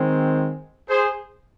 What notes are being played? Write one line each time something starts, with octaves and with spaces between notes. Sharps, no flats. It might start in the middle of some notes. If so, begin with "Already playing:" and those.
Already playing: D#3 G#3 C4
G#4 C5